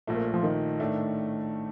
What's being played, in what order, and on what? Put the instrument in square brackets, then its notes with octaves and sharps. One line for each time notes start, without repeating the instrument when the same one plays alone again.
[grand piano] A#1 A#2 A3
[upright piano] A#3
F3
D#3
[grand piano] A2 A3 D4